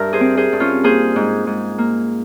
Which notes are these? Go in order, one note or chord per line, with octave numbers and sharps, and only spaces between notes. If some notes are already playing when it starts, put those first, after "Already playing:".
Already playing: G2 A#4 E5
G#4 C5
C4
G#4 C5
G2
C#4 F4
A#3 G#4 C5
G#2
G#2
A#3